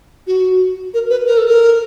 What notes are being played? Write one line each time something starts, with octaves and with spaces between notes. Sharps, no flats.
F#4
A#4
B4
A#4
A4
A#4